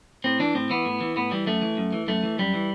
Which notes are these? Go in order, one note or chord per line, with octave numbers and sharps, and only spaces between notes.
A2 C4
E3 D4
A2 C4
E3 B3
A2
E3
A2 B3
E3 G3
F#2 A3
E3
F#2
E3
F#2 A3
E3
F#2 G3
E3